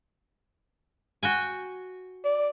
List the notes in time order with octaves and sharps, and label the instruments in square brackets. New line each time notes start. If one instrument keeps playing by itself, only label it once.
[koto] F#4 G5 G#5
[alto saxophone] D5